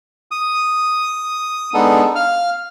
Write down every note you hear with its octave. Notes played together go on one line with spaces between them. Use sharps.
D#6
G#3 B3 D4 D#4 A4
F5 F6